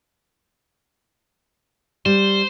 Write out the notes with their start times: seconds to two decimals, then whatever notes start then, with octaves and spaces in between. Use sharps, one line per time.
2.06 G3 C5